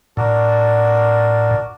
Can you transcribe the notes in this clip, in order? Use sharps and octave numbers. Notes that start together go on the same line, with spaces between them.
A2 D4 F#4 A#4